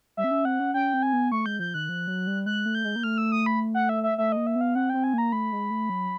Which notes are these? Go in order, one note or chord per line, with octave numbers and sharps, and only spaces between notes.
G3 E5
C4
C#4
C4 F#5
C#4
C#4 G5
C4
G#5
B3
A3 C#6
G#3 G6
F3 G6
D#3 F#6
F3
F#3
G3
G#3 F#6
A3
G6
G#3
A#3
A3 F6
E6
D#6
B5
F#5
E5
E5
A3 E5
A#3 D#5
E5
B3
F5
C4 F#5
C4 G5
G#5
A#3 A#5
A3 B5
G#3
A3
F#3